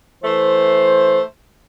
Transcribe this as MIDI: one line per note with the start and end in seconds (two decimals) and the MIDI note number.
0.24 1.22 52
0.24 1.22 57
0.24 1.22 72